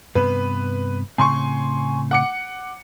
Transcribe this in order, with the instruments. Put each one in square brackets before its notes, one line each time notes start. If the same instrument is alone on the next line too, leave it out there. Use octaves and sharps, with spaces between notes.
[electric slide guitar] G2 C3 B3 [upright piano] B4
[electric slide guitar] A2 C#3 C4 [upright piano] G#5 C6 C#6
[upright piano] F#5 D6 C#7